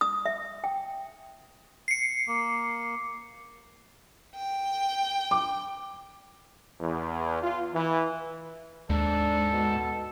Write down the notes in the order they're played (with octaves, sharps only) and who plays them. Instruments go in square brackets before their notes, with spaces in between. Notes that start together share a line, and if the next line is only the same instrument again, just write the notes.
[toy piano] D#6
E5
G5
[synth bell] C7 C#7
[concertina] A#3
[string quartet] G5
[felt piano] D6
[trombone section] E2
F4
E3
[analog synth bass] D#2 [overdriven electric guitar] G#2 [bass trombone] D4 [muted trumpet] A4
[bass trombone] B2